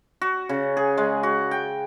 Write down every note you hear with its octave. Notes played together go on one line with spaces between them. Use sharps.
F#4
C#3
G#4
G#3
F#4
G5